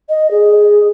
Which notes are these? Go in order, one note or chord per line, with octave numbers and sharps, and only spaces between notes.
D#5
G#4